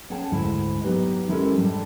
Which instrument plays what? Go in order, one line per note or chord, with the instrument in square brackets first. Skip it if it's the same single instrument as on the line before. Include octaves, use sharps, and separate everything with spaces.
[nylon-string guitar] C#4 G#4 C#5 F#5 G5 A5
D2 G#2 G#3 E4
F#3 B3 D#4 G4 B4
G#3 C#4 E4 G4 A4 A#4
G#2 G3 D4 A5